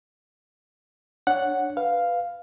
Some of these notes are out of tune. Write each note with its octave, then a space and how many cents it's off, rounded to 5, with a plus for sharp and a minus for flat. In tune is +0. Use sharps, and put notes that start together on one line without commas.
D4 +0 C#5 +0 F#5 +0
B4 +0 F5 +0